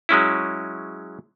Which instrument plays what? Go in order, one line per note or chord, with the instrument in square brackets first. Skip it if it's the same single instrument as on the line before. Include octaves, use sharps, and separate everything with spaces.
[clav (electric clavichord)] F#3 G#3 C#4 E4